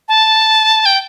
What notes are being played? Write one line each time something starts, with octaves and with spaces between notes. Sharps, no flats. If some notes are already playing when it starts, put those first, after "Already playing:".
A5
G5